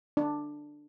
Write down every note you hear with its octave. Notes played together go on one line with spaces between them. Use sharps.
D4